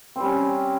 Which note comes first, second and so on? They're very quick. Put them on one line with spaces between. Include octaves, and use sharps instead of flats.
C4 G3 C#4